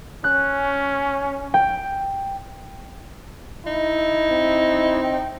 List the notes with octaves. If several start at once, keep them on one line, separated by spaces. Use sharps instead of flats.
C#4 F#6
G5
D#4 E4
C4
G5